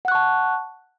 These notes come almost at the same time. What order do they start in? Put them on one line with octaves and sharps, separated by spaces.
F#5 F#6 C#6 A5